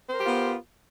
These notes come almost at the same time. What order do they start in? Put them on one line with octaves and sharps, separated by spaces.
C5 A#4 G4 F4 B3